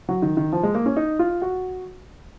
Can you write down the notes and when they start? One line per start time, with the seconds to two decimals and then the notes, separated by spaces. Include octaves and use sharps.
0.09 F#3
0.22 D#3
0.37 D#3
0.53 F3
0.63 G#3
0.75 A#3
0.86 C#4
0.96 D#4
1.19 F4
1.42 F#4